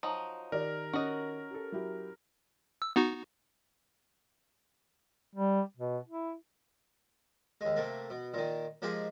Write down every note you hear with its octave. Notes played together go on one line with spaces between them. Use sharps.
F3 F#3 D#4
D#3 G4 A#4 D5
C#4 F#4 D#5
G4 A4
F#3 E4 G4
E6
B3 D#4 F#4
G3
B2
E4
D#2 G#3
C3 A3 A#3
B2
A#2 D#3
F3 G#3 A#3 G4 G#4